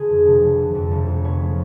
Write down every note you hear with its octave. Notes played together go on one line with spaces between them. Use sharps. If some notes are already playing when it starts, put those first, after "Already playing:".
Already playing: D3 F4 G#4 B4 G#5
F2
F1
F1
D3
F2
F1
F1
B3 C#5
F3